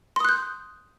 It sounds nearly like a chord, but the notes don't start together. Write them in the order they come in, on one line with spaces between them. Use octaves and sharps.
C6 D#6 F#6 G6